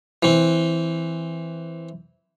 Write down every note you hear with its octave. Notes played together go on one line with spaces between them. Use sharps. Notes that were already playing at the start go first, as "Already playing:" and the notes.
E3 C4